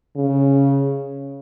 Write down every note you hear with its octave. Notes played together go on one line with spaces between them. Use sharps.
C#3